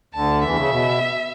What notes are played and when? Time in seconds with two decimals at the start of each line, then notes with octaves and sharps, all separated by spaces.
0.14 D2 D3 A5
0.42 E2 E3 E5
0.56 C#3
0.70 B2